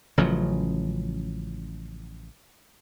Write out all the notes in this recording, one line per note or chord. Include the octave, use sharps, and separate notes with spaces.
A1 C#3 F3 F#3